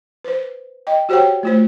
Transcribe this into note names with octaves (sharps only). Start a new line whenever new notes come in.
B4 C5
D#5 G5
F#4 G4 C5 C#5 F#5 G5
A3 F4 C5